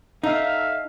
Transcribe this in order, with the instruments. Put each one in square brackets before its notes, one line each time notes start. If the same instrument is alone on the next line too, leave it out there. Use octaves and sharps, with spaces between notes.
[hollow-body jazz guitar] D#4 [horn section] A4 E5 F5